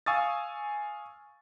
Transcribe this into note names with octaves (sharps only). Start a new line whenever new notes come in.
F5 G#5 C#6 D#6 E6 A6